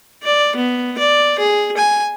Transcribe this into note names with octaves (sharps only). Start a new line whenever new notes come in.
D5
B3
D5
G#4
G#5